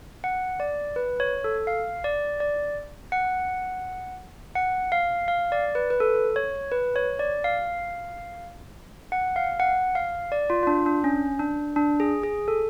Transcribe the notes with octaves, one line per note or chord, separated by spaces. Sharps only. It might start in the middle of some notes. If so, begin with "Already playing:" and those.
F#5
D5
B4
C#5
A4
F5
D5
D5
F#5
F#5
F5
F5
D5
B4
B4
A4
C#5
B4
C#5
D5
F5
F#5
F5
F#5
F5
D5
F4
F4
D4
D4
C#4
D4
D4
G#4
G#4
A4